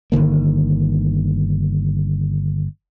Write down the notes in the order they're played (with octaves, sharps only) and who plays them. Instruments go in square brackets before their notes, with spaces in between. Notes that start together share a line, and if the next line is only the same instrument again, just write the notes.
[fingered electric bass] G1 D3 D#3 A#3